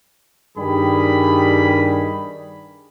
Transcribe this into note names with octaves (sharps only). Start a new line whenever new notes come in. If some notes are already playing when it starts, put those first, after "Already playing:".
G2 D#3 G3 G#4 B5